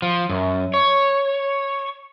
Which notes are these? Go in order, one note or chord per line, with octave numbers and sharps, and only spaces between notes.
F3
F#2
C#5